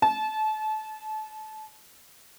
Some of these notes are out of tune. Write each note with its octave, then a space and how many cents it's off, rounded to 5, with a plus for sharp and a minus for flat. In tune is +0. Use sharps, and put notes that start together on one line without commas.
A5 -30